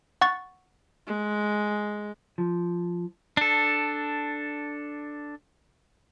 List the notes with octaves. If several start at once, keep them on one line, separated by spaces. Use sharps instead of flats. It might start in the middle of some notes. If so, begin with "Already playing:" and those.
F#5 C#6 A6
G#3
F3
D4 A4